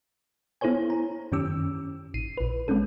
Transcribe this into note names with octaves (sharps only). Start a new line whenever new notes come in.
B3 E4 A4 C5 C#5 G#5
A#5
F#2 D#3 C#4 G4 D6 E6
A1 C7 D#7
A#1 B4
G#3 C4 C#4 A4